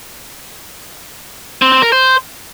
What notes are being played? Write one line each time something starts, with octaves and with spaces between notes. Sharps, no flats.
C4
C4
A#4
C5